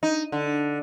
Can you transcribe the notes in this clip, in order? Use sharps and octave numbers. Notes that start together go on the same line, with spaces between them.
D#4
D3